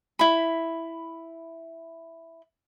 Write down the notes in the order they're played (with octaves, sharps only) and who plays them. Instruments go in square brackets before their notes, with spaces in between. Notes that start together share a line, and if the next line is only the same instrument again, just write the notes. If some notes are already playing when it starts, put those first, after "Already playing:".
[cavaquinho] E4 B5